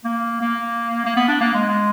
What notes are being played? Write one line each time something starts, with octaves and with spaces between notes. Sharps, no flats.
A#3
A#3
A#3
B3
D4
A#3
G#3